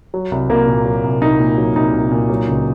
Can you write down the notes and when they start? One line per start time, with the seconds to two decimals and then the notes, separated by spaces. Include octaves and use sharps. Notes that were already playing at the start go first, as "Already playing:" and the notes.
0.14 F#3
0.32 C2
0.50 C2 A#3
0.67 A#2
0.85 F#3
1.04 C2
1.21 C2 D#4
1.39 A#2
1.57 F#3
1.76 C2 D#4
1.94 C2
2.11 A#2
2.30 F#3
2.48 C#2